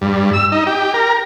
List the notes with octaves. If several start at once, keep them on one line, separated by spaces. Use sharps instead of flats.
G2
E6
D#4
G4
A#4